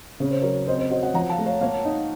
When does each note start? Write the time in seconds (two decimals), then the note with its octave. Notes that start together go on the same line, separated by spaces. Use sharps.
0.20 C#3 C#5
0.31 C5
0.42 F#3 A#4 C#5
0.67 C4 C5 D#5
0.79 C5 D#5
0.90 F#4 C5 D#5
1.03 D#5 F#5
1.14 F3 F#5 A#5
1.29 F5 A5
1.38 A3
1.46 C#5 F5
1.61 A#3 C#5 F5
1.85 D#4